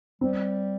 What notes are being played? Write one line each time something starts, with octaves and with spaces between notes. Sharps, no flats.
G3 C4